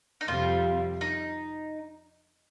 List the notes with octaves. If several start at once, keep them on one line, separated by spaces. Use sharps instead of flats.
D#4
F2 C3 G3 C4 F4
D#4